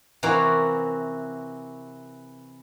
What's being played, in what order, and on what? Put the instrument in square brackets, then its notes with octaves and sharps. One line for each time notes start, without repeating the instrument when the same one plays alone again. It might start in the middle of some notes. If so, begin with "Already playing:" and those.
[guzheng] C3 E3 F#4 A#4 C#5 F5